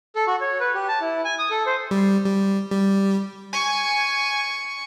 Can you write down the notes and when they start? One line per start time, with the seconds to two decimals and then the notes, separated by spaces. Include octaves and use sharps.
0.16 A4
0.27 F#4
0.41 C#5
0.60 B4
0.75 G4
0.88 A5
1.01 E4
1.25 G#5
1.39 D#6
1.51 A4
1.66 C5
1.91 G3
2.25 G3
2.71 G3
3.53 G#5 C#6